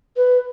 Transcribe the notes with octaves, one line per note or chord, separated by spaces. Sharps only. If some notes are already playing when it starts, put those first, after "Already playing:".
B4